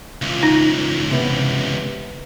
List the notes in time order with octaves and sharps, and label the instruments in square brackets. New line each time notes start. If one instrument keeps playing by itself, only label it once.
[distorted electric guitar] C#2 E3 [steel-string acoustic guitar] F4
[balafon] D#4
[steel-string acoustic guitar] C3 B3